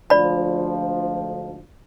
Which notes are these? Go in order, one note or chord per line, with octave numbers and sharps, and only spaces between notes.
D2 G#2 F3 D5 B5